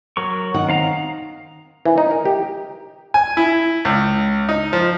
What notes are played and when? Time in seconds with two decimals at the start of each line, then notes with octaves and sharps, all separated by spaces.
0.17 F#3 A#4 C#6
0.54 D#3 F#5
0.68 C4 F5 A#5
1.85 E3
1.98 D#4
2.11 A#4
2.25 G4
3.14 G#5
3.37 E4
3.85 C#2
4.49 D#4
4.73 F3